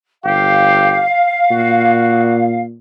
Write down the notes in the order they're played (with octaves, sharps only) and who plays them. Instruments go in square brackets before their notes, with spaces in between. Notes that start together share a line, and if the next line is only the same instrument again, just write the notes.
[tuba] G1 [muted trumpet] G4 [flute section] F5
[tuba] A#2 [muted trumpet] F#4